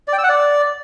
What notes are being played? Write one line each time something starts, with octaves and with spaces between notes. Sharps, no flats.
D5
G5
E6
F#5
D5